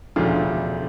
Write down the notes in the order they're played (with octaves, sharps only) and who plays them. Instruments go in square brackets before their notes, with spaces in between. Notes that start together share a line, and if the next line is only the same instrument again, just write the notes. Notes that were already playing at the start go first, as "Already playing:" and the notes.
[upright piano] E1 D2 C#3 F3 A3 D4 F4